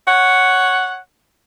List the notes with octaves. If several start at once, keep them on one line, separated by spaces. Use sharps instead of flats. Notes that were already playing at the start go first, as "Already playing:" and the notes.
C#5 F#5